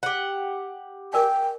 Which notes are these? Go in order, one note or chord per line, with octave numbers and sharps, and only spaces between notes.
G4 F#5
A#4 D5 G5 G#5